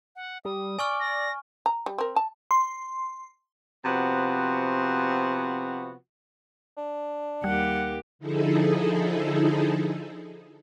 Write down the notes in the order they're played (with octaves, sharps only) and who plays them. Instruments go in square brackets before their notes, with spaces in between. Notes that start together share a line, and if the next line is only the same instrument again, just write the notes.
[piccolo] F#5
[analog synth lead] G3 [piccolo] D#6
[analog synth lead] D5 [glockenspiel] G#5 C#6 F6
[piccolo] A#6
[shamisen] A#5
G3
C4 A#4
A5
[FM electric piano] C6
[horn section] C3 F3 B3 F#4
[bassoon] D4
[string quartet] D#2 G4 [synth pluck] G3 [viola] F#5
[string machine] D3 F3 D#4 E4 G#4 A4